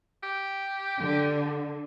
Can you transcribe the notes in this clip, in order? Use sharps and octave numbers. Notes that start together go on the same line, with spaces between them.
G4
D3